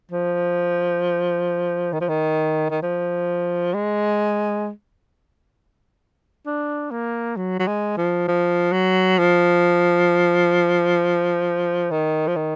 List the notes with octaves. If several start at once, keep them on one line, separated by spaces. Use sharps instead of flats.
F3
D#3
F3
D#3
D#3
F3
G#3
D4
A#3
F#3
F#3
G#3
F3
F3
F#3
F3
D#3
F3
D#3